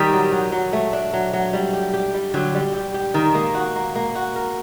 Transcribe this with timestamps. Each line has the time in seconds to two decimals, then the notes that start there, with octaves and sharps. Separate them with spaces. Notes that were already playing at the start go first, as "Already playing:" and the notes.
Already playing: D#3 G3
0.12 F#3
0.32 F#3
0.52 F#3
0.73 A3
0.93 D4
1.13 F#3
1.33 F#3
1.53 G3
1.73 G4
1.93 G4
2.14 G3
2.34 D3 F#3 G4
2.55 G3
2.74 G4
2.94 G4
3.14 D#3 A#4
3.35 A#3
3.55 F#4
3.76 A#3
3.95 A#3
4.15 F#4
4.36 A#4